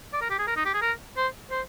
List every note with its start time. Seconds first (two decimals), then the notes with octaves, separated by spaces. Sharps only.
0.13 D5
0.22 A#4
0.30 G4
0.39 G#4
0.47 A#4
0.57 D#4
0.65 G4
0.74 G#4
0.82 A#4
1.17 C5
1.51 C5